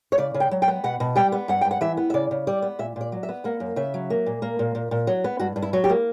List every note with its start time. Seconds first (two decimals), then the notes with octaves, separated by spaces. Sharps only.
0.12 C#5
0.18 C#3 D5
0.34 C#3
0.40 G5
0.51 F#3
0.62 G5
0.68 B3
0.84 B2 F#5
1.00 B2
1.16 G3 G5
1.32 B3
1.48 G2 F#5
1.61 G2 G5
1.71 F#5
1.81 E3 E5
1.97 B3
2.10 E5
2.14 C#3 D5
2.31 C#3
2.47 G3 D5
2.62 B3
2.79 A#2 E5
2.96 A#2 D5
3.12 F#3
3.23 E5
3.29 B3
3.44 A#3 F#5
3.60 F#2
3.76 C#3 E5
3.94 F#3
4.10 A#3
4.26 A#2
4.42 A#3
4.59 A#2
4.75 A#2
4.91 A#2
5.07 F#3
5.24 B3
5.39 G2 F#4
5.56 G2
5.62 E4
5.73 F#3
5.84 G4
5.90 A#3